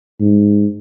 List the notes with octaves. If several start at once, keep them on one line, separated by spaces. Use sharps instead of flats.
G#2